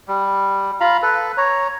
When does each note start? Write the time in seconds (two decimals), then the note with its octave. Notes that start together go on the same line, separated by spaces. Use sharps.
0.08 G3
0.80 F4 F5 A#5 B5
1.02 A4 B4
1.37 C#5 A#5